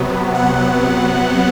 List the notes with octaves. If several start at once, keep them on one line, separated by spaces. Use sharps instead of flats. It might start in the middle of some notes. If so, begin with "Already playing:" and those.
Already playing: C3 F#3 B3
F#5